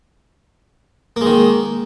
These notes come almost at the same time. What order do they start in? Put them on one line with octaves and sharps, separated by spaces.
A#3 G#3 D#3